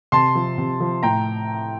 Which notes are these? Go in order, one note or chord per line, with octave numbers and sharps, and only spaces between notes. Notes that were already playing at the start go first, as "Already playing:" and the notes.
C3 A5 C6
F3
C3
F3
A2 G5 A#5